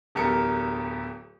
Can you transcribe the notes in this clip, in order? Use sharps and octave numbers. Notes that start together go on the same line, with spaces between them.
D1 E2 G4 A4 A#4 C#7